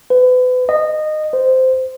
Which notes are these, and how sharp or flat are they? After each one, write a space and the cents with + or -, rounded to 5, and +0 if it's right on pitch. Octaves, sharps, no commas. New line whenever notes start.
B4 +35
D#5 -15
C5 -15